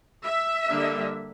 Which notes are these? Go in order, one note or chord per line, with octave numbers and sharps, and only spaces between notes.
E5
D3 G3 A#3 D4